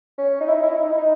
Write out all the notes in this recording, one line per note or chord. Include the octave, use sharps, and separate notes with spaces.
C#4
D#4
E4
D#4
E4
D#4
E4
D#4
E4
D#4